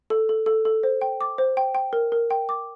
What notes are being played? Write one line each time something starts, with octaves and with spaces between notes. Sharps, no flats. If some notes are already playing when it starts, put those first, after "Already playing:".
A4
A4
A4
A4
C5
G5
D6
C5
G5
G5
A#4
A#4
G5
D6